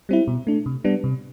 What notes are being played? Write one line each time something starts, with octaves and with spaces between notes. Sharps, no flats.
G3 C4 E4
B2
A3 D4
C3
G3 B3 D4
C3